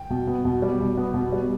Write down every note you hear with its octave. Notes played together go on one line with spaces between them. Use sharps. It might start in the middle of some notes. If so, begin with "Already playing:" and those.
Already playing: G5
B2
B3
B2
G3
B2
B3
B2
G3